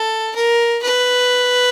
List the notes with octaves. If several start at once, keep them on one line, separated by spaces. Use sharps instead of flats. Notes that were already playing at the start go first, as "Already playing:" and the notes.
Already playing: A4
A#4
B4